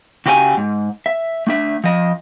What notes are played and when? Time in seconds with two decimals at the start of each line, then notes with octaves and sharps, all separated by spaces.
0.26 C#3 F#4 G4 C#5 D#5 G#5
0.57 G#2
1.06 E5
1.47 A3 D4 E5
1.84 F3 D#5